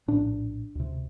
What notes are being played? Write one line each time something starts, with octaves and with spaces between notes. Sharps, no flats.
A#1 A2 D4
D2 C3